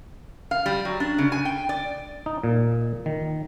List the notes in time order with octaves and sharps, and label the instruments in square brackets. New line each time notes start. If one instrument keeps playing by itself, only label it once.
[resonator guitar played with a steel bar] F5
G3
F#3
D4
C#3
G#5
G5
D5
[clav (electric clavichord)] D#4
A#2
D#3